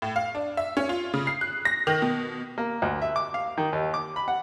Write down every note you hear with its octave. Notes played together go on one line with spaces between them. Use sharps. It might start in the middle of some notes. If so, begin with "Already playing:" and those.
A2
F5
D4
E5
C#4
F4
C#3
C7
F#6
A#6
D#3
B2
A#3
D2
E5
D6
F5
D#3
D#2
D6
B5
F#5